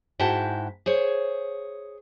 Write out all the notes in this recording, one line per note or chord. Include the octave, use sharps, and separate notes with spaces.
G#2 E4 F#4 G5 A5
G#4 C5 C#5